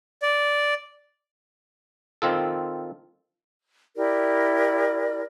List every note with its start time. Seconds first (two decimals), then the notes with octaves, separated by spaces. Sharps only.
0.22 D5
2.22 D#3 C4 F4 A4
3.96 E4 G4 A#4 D5